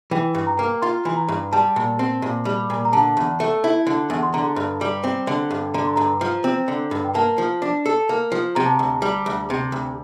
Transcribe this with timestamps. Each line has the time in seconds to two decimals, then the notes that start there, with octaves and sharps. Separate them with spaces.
0.11 E3 G5
0.35 G2
0.47 A#5
0.59 A#3
0.82 F4 C6
1.05 E3
1.17 A#5
1.28 G2
1.52 G3 A5
1.76 A#2
1.99 C4
2.22 A#2
2.45 G3
2.70 A#2
2.85 A#5
2.93 D3 A5
3.17 E2
3.40 A3
3.64 E4
3.87 D3
4.10 E2
4.23 C6
4.33 D3 A#5
4.56 G2
4.81 G3
5.04 C4
5.27 D3
5.51 G2
5.74 D3 A#5
5.85 C6
5.96 G2 A#5
6.21 F3
6.44 C4
6.68 D3
6.91 G2
7.05 G5
7.15 A#3 A5
7.38 F3
7.62 D4
7.86 A4
8.09 A#3
8.32 F3
8.55 C3 A#5
8.66 A5
8.76 D2 A#5
9.02 G3
9.26 D2
9.50 C3
9.72 D2